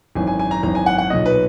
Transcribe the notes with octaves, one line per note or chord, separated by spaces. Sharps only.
G#1 F#2 E3 G#5
G#5
G#5
A#5
G#1 F#2 E3 A#5
G#5
F#5
F#5
B1 A#2 D#5
B4